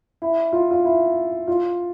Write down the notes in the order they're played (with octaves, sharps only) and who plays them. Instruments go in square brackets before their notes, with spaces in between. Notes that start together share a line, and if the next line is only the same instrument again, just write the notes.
[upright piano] E4
F4
F4
E4
F4